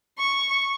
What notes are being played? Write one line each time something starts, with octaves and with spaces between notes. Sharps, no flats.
C#6